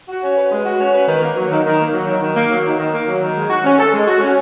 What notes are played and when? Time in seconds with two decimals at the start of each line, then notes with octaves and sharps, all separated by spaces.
0.08 F#4
0.22 C#4
0.36 B4
0.51 G#3
0.65 F#4
0.79 C#4
0.93 B4
1.08 D#3
1.22 A#3
1.36 F#3
1.50 D#3
1.65 D#3
1.79 A#3
1.94 F#3
2.07 D#3
2.22 D#3
2.35 A#3
2.50 F#3
2.65 D#3
2.79 D#3
2.93 A#3
3.07 F#3
3.21 D#3
3.35 G#3
3.50 F#4
3.64 C#4
3.78 A4
3.93 G#3
4.07 F#4
4.21 C#4